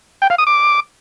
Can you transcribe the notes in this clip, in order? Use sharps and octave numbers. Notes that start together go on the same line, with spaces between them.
G5
F5
D#6
D6